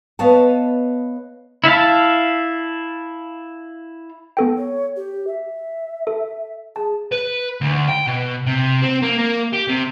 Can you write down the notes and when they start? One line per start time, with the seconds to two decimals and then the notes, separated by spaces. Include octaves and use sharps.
0.19 B3 B4 C#5 D#5 F5 A5
1.64 E4 E5 F5 A5
4.37 B3 A4 G5
4.57 C#5
4.96 G4
5.27 E5
6.07 A4
6.76 G#4 A5
7.12 B4
7.61 D2
7.88 G5
8.07 B2
8.46 C3
8.82 C4
9.02 A#3
9.19 A#3
9.53 G4
9.68 C3